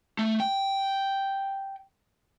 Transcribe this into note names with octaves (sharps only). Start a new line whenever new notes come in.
A3
G5